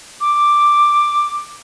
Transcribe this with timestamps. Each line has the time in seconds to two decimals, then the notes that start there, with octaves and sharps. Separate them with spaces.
0.21 D6